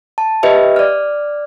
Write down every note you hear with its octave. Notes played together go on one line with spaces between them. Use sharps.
A5
G4 B4 D#5 E5
D5 F6